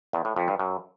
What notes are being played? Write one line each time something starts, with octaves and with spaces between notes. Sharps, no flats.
E2
A2
F2
G2
F#2